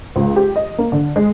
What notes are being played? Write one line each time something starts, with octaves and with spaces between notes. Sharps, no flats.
C#2
G4
D#5
A#3
D3
G#3